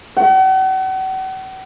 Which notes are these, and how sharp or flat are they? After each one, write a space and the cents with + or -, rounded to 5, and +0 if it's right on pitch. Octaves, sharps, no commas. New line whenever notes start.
F#5 +40